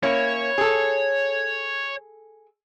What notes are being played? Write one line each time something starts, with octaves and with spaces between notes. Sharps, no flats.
A#3 C#4 E4 C#5
G#4 A4